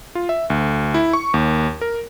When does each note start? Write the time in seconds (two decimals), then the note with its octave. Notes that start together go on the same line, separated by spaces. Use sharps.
0.15 F4
0.29 E5
0.50 D2
0.94 E4
1.13 C#6
1.34 D#2
1.81 A#4